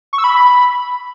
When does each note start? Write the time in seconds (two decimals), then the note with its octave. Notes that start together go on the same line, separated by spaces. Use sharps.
0.13 C#6
0.18 E6
0.24 B5